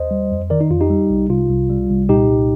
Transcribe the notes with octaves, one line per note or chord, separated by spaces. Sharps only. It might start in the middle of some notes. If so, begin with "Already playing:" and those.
Already playing: D#2 C5 D#5
G3
F2
D#3 A#4 D5
D#4
F2 F4
D#4 G4
G3
C2
C3 F4
C2
G3
C2
A#2 D#4 G4
C2